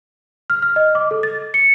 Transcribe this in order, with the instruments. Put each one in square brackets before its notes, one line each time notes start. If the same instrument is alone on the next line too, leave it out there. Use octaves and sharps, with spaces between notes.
[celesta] F6
F6
D#5
D6
A4
A6
C#7